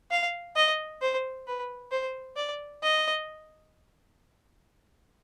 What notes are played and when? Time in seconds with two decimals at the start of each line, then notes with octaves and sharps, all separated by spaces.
0.11 F5
0.56 D#5
1.02 C5
1.48 B4
1.92 C5
2.37 D5
2.83 D#5